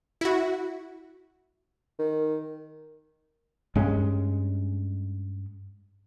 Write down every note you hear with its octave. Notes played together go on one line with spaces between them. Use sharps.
E4 F#4
D#3
G2 G#3 C#4